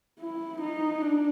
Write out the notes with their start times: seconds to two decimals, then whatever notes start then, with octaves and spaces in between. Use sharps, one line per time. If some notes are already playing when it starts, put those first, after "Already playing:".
0.20 E4
0.61 D#4
1.01 D4